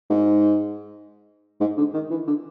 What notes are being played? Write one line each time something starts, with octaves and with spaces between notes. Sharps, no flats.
G#2
G#2
D3
D#3
E3
D3